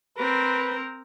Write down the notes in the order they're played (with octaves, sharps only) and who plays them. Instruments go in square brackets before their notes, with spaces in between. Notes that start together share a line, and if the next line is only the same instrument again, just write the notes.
[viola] C4 A#4 [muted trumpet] B4